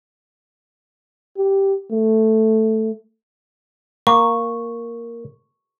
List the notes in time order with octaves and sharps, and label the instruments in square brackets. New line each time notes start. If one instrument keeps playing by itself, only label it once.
[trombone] G4
A3
[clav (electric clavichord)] A#3 [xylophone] C#6